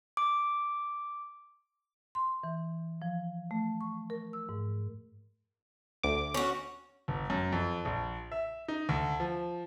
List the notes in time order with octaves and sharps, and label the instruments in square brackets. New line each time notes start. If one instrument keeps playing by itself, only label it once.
[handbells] D6
[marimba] C6
E3
F3
A3
C#6
A#4
E6
G#2
[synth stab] D2 D6
[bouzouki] C#4 F#4
[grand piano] G1
F#2
F2
A#1
E5
D#4
D2
F3